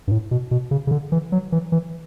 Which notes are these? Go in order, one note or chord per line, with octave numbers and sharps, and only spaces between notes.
G2
A2
B2
B2
C#3
C#3
D3
E3
F#3
E3
E3